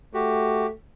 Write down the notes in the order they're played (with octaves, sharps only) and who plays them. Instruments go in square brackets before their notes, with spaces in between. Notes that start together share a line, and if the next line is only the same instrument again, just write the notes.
[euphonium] A3 [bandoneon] F#4 G4